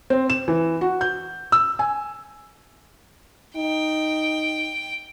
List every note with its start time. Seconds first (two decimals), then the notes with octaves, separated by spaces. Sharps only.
0.10 C4
0.30 E7
0.48 E3
0.81 F#4
1.01 G6
1.52 E6
1.79 G#5
3.56 D#4 G5